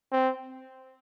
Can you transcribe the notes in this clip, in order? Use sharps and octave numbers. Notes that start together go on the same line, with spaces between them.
C4